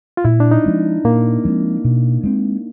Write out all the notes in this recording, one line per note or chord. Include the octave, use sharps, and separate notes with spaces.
F4
A#2 E4
D4
D#4
F3 G#3 C4
A#2 A#3
F3 G#3 C4
B2
G#3 C4